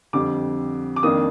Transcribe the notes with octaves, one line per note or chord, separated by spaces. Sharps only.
F2 D3 G3 C4 D6
D6
F2 D#3 A#3 D4 D#6